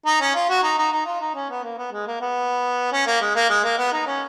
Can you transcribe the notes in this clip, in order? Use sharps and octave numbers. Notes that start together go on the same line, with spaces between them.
D#4
C#4
F4
F#4
D#4
D#4
D#4
F4
D#4
C#4
B3
A#3
B3
G#3
A#3
B3
C#4
A#3
G#3
A#3
G#3
A#3
B3
D#4
C#4